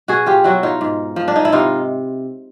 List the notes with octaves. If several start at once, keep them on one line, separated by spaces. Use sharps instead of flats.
B2 F#4 G#4
F4 G4
F#3 E4 F#4
D#4 F4
G#2
F3
D4
D#4
E4
C3 D#4 F4